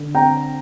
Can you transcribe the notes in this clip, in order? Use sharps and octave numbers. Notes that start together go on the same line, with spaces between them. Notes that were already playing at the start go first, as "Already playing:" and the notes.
Already playing: D3
C4 G5 A#5